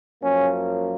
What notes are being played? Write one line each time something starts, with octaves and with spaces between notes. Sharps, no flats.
F#2 F3 A#3 C#4